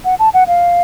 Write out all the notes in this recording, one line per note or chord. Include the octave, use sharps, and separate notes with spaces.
F#5
A5
F#5
F5